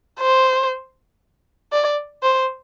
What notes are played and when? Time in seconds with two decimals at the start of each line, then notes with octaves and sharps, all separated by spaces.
0.20 C5
1.72 D5
2.23 C5